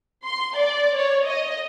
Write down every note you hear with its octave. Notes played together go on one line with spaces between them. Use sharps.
C6
D5
C#5
D#5